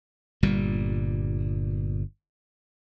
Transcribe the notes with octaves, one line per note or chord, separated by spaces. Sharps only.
G1 A#2 G3